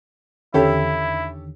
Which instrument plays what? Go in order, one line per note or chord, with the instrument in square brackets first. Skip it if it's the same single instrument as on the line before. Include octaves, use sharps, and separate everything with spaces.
[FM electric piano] E2 D3 D#3 [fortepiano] C#4 G4 A4 [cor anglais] E4